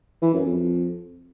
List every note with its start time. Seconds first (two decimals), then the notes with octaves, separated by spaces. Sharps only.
0.22 E3
0.34 F#2
0.45 F2